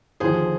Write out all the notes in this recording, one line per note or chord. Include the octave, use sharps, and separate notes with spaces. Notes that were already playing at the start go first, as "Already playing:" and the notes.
D#2 D3 F3 G#4 C5